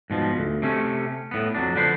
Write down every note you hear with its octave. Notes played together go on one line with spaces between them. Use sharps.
G#2 B2 F3
D2
C3 A3 C#4
A2 B3
F2 F#3 D4
D3 F3 B4 C5